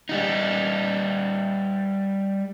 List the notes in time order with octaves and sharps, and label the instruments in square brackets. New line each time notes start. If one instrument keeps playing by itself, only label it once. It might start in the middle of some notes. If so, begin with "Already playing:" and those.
[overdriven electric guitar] G3 D#4